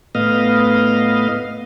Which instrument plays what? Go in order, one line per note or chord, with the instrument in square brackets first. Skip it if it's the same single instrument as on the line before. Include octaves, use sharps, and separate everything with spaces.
[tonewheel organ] A2 B3 D#5 F5